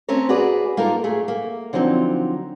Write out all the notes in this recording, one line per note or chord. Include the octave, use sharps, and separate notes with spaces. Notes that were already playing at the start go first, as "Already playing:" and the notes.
A3 C4 C#4 A#4 C#5
F#4 G#4 B4 D5
A#3 D#4 F4 A4 A#4
A3 G#4
A#3
D3 F3 F#3 C4 D#4